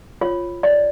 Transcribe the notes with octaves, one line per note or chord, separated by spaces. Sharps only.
F4 C#5
C#5 D5